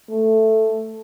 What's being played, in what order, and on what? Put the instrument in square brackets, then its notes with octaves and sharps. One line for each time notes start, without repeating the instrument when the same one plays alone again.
[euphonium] A3